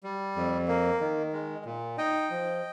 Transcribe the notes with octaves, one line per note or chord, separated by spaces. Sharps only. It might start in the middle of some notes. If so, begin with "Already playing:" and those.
G3
F2
A#3
D#3
G#3
A#2
D#4 D#5 G5
F3